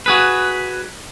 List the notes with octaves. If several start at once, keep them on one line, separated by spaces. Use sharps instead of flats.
F#4 G#4 B4